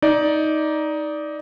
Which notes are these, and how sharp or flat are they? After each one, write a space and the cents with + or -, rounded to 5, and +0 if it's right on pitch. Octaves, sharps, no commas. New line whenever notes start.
D#4 +10 D5 -5